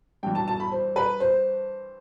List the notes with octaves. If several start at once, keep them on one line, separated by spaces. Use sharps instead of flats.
G2 E3 G5
A5
A5
B5
C5
B4
C5